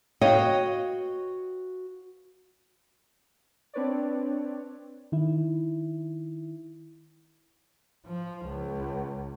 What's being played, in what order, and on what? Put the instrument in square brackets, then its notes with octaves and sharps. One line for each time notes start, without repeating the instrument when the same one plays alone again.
[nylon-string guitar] F#4 B4 C#5 D#5 F5 G5
[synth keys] C4 D4 B4 C#5 D5
[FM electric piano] D#3 E4
[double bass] F3
C#2